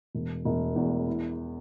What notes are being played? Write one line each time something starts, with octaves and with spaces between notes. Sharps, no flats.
E1
E1
E2
E4